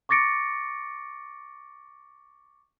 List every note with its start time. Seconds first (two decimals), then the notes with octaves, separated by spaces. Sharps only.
0.09 C#6 D6 A6 A#6 C#7 D7